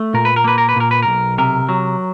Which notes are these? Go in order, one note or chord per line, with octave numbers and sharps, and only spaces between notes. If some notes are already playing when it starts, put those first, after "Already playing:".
Already playing: A3
A#2 A#4
B4
A#4
A#3 B4
A#4
B4
A#2 A#4
B4
B1 A#4
C3 A#4
F#3